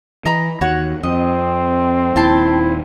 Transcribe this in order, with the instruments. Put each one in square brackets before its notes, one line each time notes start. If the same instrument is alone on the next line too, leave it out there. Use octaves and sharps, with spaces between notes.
[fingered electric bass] E3 [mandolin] D#5 A#5 B5
[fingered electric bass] D#2 [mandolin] F#4 C#5 F#5
[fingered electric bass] F2 [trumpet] C4 [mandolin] D#5
[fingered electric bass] D#1 D#2 [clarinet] E4 [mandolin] G5 A5 C6